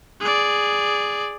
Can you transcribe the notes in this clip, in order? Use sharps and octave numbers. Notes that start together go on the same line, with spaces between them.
G#4 D5